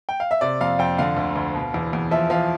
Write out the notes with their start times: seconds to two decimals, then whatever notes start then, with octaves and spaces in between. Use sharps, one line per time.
0.09 G5
0.20 F5
0.31 E5
0.41 C3 D5
0.61 F2 F5
0.79 F2 G5
0.98 D3 F5
1.17 D2
1.36 D2
1.55 B2
1.74 E2
1.93 E2
2.11 F3 E5
2.30 F3 F5